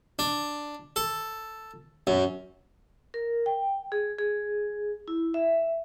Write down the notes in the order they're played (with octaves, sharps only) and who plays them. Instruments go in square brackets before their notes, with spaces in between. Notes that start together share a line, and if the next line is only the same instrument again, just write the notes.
[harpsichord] D4
A4
F#2
[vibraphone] A#4
G5
G#4
G#4
E4
E5